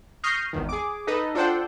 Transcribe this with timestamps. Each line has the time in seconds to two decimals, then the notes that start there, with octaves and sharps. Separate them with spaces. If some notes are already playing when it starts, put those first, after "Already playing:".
0.24 C#6 D#6 F6 G6 A#6 C7
0.53 G#1 E2 D#3
0.69 G#4 D6
1.07 D#4 A4 B4 D#5
1.35 D4 F4 A4 C5 F#5 G5